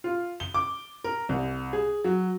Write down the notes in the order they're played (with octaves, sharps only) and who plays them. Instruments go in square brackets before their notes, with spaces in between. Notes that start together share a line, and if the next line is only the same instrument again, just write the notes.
[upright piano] F4
G7
D6
A#4
C2
G#4
F#3